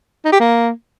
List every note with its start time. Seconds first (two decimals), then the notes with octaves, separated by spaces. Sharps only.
0.25 D#4
0.32 G4
0.40 A#3